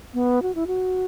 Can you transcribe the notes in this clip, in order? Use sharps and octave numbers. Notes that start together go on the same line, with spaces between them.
B3
F#4
E4
F#4